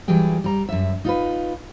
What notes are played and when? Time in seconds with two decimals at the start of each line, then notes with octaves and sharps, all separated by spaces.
0.08 E3 F#3 G3 G#4 G5
0.44 G3 A#5
0.69 F#2 E5
1.05 D#4 F4 G#4 B4